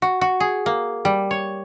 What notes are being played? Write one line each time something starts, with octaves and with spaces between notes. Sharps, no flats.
F#4
F#4
G#4
A#3
G3
C#5